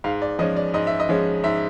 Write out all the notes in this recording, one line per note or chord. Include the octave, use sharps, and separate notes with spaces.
G#2 F5
D5
F3 G#3 C#4 D#5
D5
G#2 D#5
E5
D#5
F3 G#3 C#4
G#2 E5